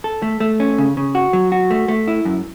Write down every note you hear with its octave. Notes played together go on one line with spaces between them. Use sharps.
A4
A3
A3
C#4
C#3
C#3
F#4
F#3
F#4
A3
A3
E4
F#2